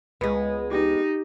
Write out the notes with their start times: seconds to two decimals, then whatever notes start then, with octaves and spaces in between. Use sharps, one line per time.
0.21 C#2 G#3 B3
0.71 D#4 G4